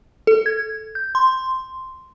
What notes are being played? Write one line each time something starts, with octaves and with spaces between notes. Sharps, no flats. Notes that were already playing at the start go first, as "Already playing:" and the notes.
A4
G#6
G6
C6